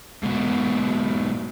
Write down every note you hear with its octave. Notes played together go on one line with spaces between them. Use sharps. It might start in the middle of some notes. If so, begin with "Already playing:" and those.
G#2 B2